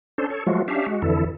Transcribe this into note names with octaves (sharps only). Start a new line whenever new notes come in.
C#4 D4 A4 C5
A4 C#5
F3 F#3 G#3 A3 F4 F#4
C#4 D4 G4 E5 F5
G#3 F#4
F2 D3 E3 E4 A4